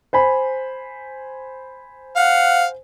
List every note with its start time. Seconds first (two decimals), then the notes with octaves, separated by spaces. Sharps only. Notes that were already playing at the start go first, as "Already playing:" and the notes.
0.13 C5 G#5 B5
2.16 F5 F#5